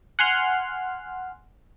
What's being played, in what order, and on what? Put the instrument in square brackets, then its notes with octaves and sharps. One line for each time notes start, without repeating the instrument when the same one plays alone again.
[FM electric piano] F#5 G#5 C6 F6 F#6